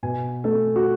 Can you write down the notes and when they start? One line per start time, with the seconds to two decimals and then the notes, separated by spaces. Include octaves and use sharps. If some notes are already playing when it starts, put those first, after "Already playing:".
0.03 B2 G#5
0.44 A3 A4
0.76 F#4